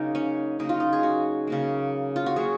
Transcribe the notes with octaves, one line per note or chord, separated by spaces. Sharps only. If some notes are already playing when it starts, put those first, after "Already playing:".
Already playing: C#3 F#3 A#3 D#4
C#4
C#3 F#3 A#3 D#4
F4
D#4
G#4
F#4
C#3 F#3 A#3
F4
F#4
C#3 F#3 A#3 G#4